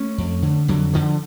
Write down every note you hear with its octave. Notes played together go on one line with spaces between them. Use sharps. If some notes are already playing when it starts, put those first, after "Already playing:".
Already playing: A3 C#4
F2
D3
F2 D3 F#3
D3 F3